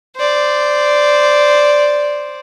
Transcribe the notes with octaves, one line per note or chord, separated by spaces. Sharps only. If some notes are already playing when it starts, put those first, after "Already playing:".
C5 D5